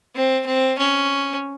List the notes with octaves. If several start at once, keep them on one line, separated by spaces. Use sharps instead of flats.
C4
C4
C#4